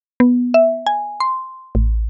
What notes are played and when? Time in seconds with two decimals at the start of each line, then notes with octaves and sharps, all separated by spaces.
0.20 B3
0.54 E5
0.86 G#5
1.20 C6
1.75 A1